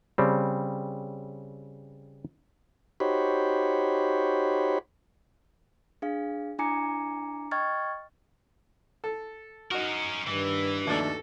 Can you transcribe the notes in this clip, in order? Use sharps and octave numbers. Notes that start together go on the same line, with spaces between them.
C#3 G3 C4
D#4 F#4 G4 C5 C#5 B5
D4 G#4 F5
D4 E4 G#5 A#5 D6 C#7
D#5 G5 C#6 F6 G#6 A6
A4
C#4 D#4 F#4 A#4
G2 D#3 E3
D#2 A3 D4 F#4 A4